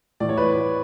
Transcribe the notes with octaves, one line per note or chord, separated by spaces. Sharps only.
A2 E3 D5
C#5
B4 D5